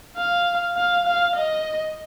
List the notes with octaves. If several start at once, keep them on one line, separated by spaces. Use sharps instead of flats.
F5
F5
F5
D#5